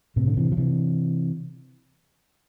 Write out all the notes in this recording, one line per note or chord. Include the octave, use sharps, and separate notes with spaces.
A2 C3
D3
C3 E3
F3
C3 E3